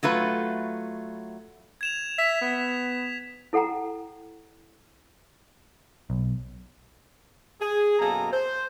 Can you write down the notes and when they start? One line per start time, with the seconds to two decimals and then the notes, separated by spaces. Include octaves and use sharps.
0.03 F#3 A3 F4 B4
1.81 G#6 E7 F7
2.19 E5 B6
2.41 B3
3.53 E4 A4 F#5 G5 A#5
6.10 B1
7.61 G#4
7.99 F#2 B2 A#3 G#4 A4 A#5
8.32 C5